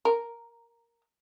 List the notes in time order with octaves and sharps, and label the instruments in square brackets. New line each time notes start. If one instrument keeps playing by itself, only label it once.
[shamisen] A#4